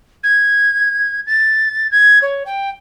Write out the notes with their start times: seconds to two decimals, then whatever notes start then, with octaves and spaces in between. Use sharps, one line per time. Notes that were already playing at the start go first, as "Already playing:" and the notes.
0.23 G#6
1.26 A6
1.91 G#6
2.22 C#5
2.46 G5